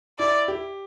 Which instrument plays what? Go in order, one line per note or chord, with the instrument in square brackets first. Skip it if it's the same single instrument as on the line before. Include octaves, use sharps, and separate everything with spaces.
[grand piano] E4 [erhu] D5
[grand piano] G4